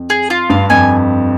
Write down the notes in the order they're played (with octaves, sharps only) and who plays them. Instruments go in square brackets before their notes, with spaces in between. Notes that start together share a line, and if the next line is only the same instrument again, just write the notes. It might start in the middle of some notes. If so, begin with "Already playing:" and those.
Already playing: [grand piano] F2
[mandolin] G#4
F4
[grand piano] G2 [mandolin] F5
[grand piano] F2 [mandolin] G#5